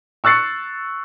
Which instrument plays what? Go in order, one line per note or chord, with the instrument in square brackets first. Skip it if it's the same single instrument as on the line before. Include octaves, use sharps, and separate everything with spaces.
[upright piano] C#6 E6 F#6 A6 C7 C#7